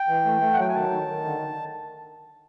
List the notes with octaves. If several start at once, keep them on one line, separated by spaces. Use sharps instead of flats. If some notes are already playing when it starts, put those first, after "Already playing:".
Already playing: G5
E3
A3
A3
F#5
F#3 G5
G#5
D#3 A5
D#3
D#3
D3